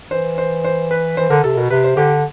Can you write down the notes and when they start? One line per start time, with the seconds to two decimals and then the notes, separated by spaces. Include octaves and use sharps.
0.11 E3 C5
0.38 C5
0.64 C5
0.91 B4
1.17 E3 C5
1.30 D3 A#4
1.44 C3 A4
1.57 B2 A#4
1.70 C3 B4
1.84 C5
1.97 D3 G4